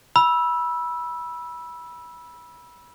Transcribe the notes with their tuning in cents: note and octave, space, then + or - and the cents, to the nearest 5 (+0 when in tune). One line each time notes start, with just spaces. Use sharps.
B5 -25 E6 +0